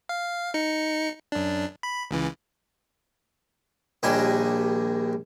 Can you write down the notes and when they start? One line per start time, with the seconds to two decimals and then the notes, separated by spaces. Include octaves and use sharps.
0.09 F5
0.54 D#4 C#7
1.32 F#2 D4
1.83 B5
2.11 C#2 C#3 E3
4.03 A#1 D#2 G3 D4 D#5 G#5